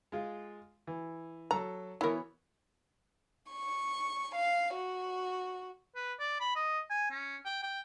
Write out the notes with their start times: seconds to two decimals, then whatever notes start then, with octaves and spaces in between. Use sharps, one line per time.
0.12 G#3 F4
0.87 E3
1.51 F#3 A4 A#5
2.01 E3 B3 E4 A#4 C#5
3.50 C#6
4.35 F5
4.75 F#4
5.95 B4
6.19 D5
6.40 B5
6.56 D#5
6.90 G#5
7.11 C#4
7.45 G5
7.63 G5